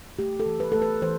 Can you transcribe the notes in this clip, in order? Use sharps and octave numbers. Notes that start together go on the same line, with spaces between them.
A3 G4
A4
E3
B4
A3 A4
B4
E3 C5